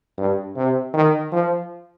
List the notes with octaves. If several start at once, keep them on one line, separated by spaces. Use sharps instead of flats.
G2
C3
D#3
F3